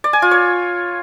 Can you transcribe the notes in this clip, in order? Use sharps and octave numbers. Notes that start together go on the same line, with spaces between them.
D5
G#5
F4
C#5